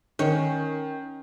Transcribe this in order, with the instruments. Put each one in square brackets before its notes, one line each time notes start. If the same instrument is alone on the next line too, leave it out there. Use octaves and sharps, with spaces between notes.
[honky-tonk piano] D#3 [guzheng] C#4